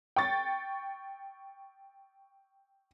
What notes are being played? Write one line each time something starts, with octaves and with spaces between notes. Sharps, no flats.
G5 C#6 A6